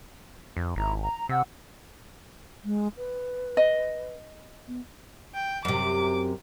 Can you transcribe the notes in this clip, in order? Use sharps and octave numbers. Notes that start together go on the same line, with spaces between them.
F2
G#1 E4 A#5
A#5
C3 F#5 E6
G#3
B4
D#5
B3
G5
F#2 C3 D6